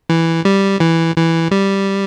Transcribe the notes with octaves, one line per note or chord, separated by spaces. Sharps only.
E3
G3
E3
E3
G3